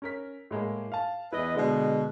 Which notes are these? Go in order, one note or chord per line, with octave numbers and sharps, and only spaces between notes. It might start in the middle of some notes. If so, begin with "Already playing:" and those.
C#4 A#4 B6
A2 G#3 A#3
F5 A5
E2 E4 B4 D#5
B2 D3 G#3